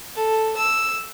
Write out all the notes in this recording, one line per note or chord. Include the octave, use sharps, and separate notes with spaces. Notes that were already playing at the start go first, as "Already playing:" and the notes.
A4
E6